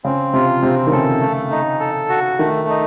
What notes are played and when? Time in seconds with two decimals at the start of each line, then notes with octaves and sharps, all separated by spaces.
0.04 C#3 C4
0.33 C3 F4
0.62 C3 C4
0.87 D#3
0.92 C#3 A4
1.21 A3
1.51 D#4
1.80 A4
2.09 F#4
2.39 D#3 A3
2.69 D#4